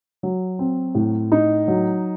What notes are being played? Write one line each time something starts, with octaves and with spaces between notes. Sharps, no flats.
F#3
C4
A2
D#4
F#3